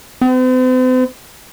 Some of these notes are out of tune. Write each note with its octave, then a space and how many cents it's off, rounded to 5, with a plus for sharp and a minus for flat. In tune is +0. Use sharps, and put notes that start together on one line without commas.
C4 -45